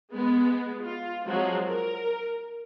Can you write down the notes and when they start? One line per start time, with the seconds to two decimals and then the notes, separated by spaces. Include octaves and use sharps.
0.12 G#3 B3
0.82 F4
1.26 F3 F#3 G#3 C4 F#4 G#4
1.64 A#4